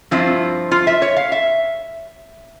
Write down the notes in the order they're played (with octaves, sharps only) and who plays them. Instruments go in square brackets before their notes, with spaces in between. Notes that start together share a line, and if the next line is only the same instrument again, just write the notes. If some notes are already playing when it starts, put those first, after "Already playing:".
[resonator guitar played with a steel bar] G2 F3 C4 E4 F4
F4
E5
C#5
F5
E5